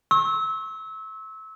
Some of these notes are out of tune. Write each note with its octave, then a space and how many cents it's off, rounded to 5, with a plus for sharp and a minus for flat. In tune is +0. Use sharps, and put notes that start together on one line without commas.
C#6 -35 E6 -25